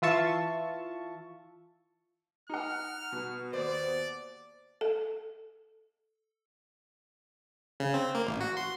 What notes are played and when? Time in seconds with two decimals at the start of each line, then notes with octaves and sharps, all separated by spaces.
0.02 E3 F4 E5 A5 C#6
2.49 D#4 F#5 F6
3.12 B2
3.53 D#2 C5 D5
4.81 A4
7.80 C#3
7.94 C4
8.15 A#3
8.27 A1
8.41 F#4
8.57 C6